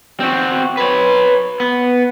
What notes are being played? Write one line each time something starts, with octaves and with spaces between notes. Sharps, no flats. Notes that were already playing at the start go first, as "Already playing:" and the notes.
C4 F#4
B4 C#5
B3